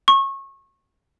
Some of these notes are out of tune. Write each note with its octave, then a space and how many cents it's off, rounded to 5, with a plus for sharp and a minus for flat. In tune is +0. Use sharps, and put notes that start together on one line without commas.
C#6 -25